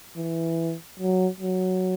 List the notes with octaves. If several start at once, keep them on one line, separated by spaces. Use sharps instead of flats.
E3
F#3
F#3